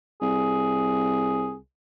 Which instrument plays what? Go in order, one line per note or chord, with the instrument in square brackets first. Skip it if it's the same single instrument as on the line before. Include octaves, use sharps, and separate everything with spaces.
[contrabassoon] C2 [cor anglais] G#4